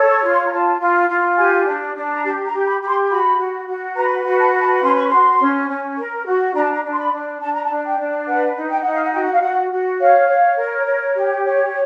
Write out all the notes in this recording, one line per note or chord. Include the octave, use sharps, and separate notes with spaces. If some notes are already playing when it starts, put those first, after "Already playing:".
Already playing: A4 C#5
C#6
F4
C6
A#5
F4 A5
F4
F4
G4 G#5
D4
D4
A#5
G4 A5
A#5
G4
B5
G4 B5
C6
F#4 B5
F#4
F#4
B4 A#5
F#4
A5
B4
A5
C#4 C6
C#6
F#4 C6
C#4
C#4
A#4
F#4
D4 A#5
A5
A#5
D4
C6
B5
D4
D4 A5
A#5
A5
D4
G5
D4
B4 F#5
D#4
G5
D#4 F#5
F5
F#5
F#4 G5
F#5
F5
F#4 F#5
F#4
C#5 F5
C#5
A#4
C#5
G4
C#5